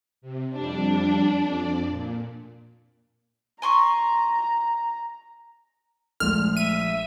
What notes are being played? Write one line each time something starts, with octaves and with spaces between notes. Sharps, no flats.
C3
F2 G3 D4
F2 D5
A#2
G#5 A#5 C6 C#6
A#1 F3 G#3 A3 F6
E5 D#7